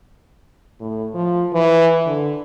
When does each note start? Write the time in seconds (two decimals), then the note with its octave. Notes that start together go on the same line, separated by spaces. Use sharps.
0.81 A2
1.14 F3
1.53 E3
2.06 D3